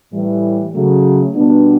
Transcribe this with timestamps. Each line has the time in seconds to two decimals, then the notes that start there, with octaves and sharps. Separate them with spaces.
0.12 A2 E3 G3
0.74 C#3 F#3 A3
1.35 B2 G3 B3 D4